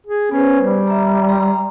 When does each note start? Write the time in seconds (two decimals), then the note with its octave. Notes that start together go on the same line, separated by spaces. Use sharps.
0.07 G#4
0.31 B3 C#4 B4 C5
0.61 G3
0.87 E5 A#5
1.28 G5 A#5 C6